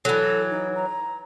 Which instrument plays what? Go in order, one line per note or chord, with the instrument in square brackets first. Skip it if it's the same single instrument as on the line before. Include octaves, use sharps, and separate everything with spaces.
[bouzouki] E3 F#3 [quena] A4
[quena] D#4
A#5